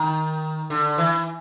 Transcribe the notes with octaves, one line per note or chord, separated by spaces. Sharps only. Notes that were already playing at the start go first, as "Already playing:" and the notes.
Already playing: D#3
D3
E3